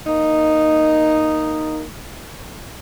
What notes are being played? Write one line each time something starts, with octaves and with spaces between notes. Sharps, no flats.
A#3 D#4